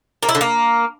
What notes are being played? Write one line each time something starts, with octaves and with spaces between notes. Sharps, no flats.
A#3
E4
D3
A#3